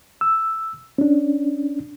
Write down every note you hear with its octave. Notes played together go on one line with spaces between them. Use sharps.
E6
C#4 D4